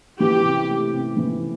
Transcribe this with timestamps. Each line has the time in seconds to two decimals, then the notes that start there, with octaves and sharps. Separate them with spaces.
0.20 E3 G4
0.44 C3
0.69 A3
0.93 C3
1.17 E3